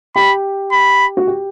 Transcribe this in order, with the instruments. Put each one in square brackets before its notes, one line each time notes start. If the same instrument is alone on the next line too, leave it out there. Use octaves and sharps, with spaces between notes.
[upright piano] G4 [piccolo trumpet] B5
[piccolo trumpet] B5
[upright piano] F#4
G4